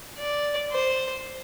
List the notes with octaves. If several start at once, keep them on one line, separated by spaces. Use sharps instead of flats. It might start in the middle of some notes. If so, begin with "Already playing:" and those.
D5
C5